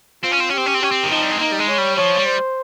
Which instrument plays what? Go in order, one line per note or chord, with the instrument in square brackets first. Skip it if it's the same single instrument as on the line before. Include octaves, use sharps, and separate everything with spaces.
[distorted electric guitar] C4 [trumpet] F4
[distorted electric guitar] C#4
C4
C#4
[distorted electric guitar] C4 [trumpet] G4
[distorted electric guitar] C#4
C4
[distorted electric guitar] C#4 [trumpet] G4
[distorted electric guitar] C4
D#3
[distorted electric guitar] F3 [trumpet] D#4
[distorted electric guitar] G3
G#3
[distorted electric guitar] A#3 [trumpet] D#4
[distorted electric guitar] G3
G#3
[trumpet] C#5
[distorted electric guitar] G3
[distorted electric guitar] F3 [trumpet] C#5
[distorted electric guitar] G3
[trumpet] C5